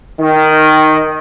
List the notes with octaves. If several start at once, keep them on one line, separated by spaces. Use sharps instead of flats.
D#3